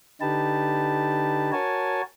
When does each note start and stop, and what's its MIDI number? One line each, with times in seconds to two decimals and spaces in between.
0.21 1.52 50
0.21 1.52 63
0.21 1.52 67
0.21 1.52 71
0.21 1.52 81
1.52 2.02 66
1.52 2.02 70
1.52 2.02 73
1.52 2.02 80
1.52 2.02 81